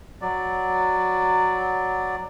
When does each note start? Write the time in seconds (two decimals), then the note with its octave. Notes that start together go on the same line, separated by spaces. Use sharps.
0.21 F#3 D5